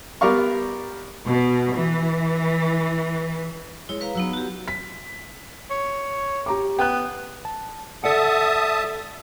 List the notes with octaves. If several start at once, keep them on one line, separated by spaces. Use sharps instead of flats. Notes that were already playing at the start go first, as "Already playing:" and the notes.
G3 B3 A#4 D5 F5 C#6
B2
E3
G#3 E4 C#5
B4 F5 A#5
F#3 B3 D#4 E6
F#4 G4
B6
C#5
G4 A#5 D6
B3 G5 F#6
A5
A4 D5 E5 F#5 A5 D#6